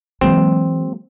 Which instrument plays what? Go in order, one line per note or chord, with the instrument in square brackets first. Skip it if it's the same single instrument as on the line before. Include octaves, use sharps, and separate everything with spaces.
[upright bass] E3 D#4 [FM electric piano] F#3 G#3 A#3 [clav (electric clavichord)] C4